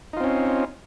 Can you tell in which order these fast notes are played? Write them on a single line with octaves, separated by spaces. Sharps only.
D#4 F4 C4 C#4